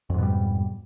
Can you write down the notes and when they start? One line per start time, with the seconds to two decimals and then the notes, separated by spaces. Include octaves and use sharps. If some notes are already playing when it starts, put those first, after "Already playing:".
0.10 F2
0.14 G#2
0.18 B2
0.23 G3